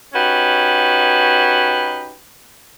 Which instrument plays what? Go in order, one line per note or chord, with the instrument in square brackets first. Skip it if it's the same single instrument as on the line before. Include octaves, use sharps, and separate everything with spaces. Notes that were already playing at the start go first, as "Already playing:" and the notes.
[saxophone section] C#4 D#4 F#4 G4 B4